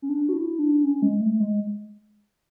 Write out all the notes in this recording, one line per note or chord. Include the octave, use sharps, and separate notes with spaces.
C#4
D4
F#4
E4
D4
C#4
G#3
A3
G#3